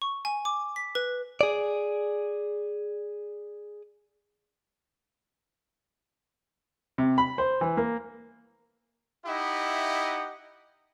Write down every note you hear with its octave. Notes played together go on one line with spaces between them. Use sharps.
C#6
G#5
D6
B6
B4
G#4 D5
C3
B5
C5
E3
A#3
D#4 E4 G4 D#5 E5 F#5